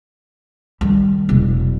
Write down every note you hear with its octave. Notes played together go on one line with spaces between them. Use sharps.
D#3 G3
E1 F#3